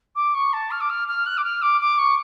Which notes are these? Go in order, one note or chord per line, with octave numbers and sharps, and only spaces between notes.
D6
C#6
A5
F6
D6
F6
F6
F#6
D6
F6
D6
D6
C#6